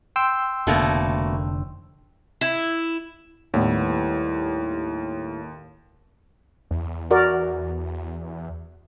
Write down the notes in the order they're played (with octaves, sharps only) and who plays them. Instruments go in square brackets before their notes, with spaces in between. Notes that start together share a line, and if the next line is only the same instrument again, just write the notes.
[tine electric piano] G5 C6 E6
[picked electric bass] F1 D3 [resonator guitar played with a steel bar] B2 A3 A#3
[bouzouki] E4
[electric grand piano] D#2 [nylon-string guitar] A2 G3 B3
[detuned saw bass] E2
[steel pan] F#4 A#4 D5